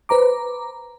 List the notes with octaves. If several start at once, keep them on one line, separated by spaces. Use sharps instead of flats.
B4 C5 A#5 D6